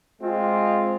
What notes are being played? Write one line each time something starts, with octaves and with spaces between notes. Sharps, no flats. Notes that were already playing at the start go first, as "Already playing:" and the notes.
G#3 C4 F4